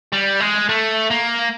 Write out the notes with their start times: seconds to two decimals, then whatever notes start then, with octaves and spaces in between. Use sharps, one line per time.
0.13 G3
0.40 G#3
0.69 A3
1.10 A#3